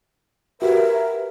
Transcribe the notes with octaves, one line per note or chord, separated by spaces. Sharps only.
F#4 G4 A#4 B4 E5